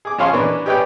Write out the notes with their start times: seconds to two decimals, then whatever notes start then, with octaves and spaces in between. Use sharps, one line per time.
0.05 G#4 D6
0.18 F3 C#4 G#4 F5 C6 C#6
0.33 E3 A#3 C#4 D4 B4
0.66 G4 G#4 B4 C#5 D5 G5